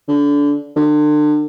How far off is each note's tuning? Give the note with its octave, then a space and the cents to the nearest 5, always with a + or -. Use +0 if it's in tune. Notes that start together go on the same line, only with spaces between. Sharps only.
D3 -25
D3 +35